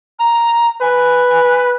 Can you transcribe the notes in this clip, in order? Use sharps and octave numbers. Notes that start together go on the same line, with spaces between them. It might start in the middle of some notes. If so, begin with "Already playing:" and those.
A#5
B4 G#5